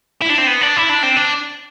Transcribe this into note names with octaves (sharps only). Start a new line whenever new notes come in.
E4
D4
C4
B3
D4
E4
D4
C4
D4